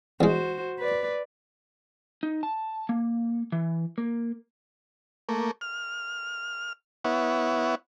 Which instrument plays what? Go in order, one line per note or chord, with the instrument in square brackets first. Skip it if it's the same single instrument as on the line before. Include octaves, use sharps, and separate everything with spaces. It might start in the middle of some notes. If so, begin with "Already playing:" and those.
[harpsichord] E2 G#3 [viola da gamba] F#4 C5
[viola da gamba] B4 D5
[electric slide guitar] D#4
A5
A#3
E3
A#3
[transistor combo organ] A3 A#3
F6
B3 E4 C#5 F#5